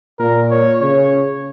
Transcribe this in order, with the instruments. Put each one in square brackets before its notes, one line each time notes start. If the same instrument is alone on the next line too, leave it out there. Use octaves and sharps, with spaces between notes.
[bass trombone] A#2 [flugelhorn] A#4
[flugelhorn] C#5
[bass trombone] C#3 [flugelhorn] C#5